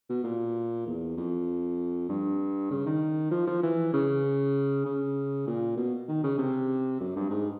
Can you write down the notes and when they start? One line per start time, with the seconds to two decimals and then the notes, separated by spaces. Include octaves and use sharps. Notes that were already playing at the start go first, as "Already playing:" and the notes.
0.09 B2
0.24 A#2
0.86 E2
1.17 F2
2.09 G2
2.71 C#3
2.86 D#3
3.31 F3
3.47 F3
3.63 E3
3.93 C#3
4.85 C#3
5.47 A#2
5.77 B2
6.08 D#3
6.23 C#3
6.38 C3
7.00 F#2
7.16 G2
7.30 G#2